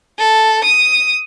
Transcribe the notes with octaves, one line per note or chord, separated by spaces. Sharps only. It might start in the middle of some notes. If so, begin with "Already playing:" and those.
A4
D#6